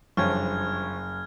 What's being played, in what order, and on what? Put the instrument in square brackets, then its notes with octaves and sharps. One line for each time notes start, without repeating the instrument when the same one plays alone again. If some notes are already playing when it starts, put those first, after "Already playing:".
[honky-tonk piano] F#1 [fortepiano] G2 [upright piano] F3 C#5 [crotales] F6 G#6